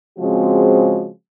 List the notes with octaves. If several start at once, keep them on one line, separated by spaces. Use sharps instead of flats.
C#3 F3 G#3 C4 F#4